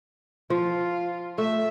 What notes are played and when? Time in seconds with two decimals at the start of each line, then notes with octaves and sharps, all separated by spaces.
0.50 F3 F4
1.38 A3 E5